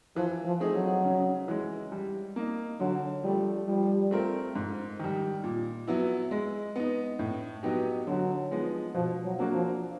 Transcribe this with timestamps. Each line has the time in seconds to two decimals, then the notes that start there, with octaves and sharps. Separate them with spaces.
0.16 E3 F3
0.45 F3
0.60 A3 C4 D#4 G#4
0.75 F#3
1.04 C#3
1.48 E3 G#3
1.92 G3
2.36 A#3 D#4
2.80 D3 F#3
3.24 F3 G3 A3
3.68 F3 G3
4.11 A3 C4 F4 A#4
4.55 G#2
4.99 D#3 G3
5.44 A#2
5.87 F#3 B3 E4
6.31 G#3
6.76 B3 D#4
7.19 A2
7.63 F#3 B3 D#4 G4
8.07 D3 F#3
8.51 F3 G#3 B3 D#4
8.94 B2 F3
9.24 F#3
9.39 F#3 A#3 D4 F#4
9.53 F3